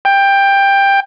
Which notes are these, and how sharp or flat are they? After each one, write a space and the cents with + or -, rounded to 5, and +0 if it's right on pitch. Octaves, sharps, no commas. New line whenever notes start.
G5 +15